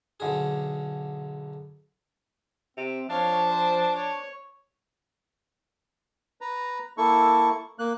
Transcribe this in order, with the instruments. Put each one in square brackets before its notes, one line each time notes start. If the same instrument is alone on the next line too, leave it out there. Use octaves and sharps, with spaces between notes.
[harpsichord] B1 D3 G#4
[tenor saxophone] C3 [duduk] C4
[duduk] F3 [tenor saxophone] D4 [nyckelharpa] C#5 F5
[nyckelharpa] C5
C#5
[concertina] B4 A#5
A#3 E4 A4 C#6
A#3 F#6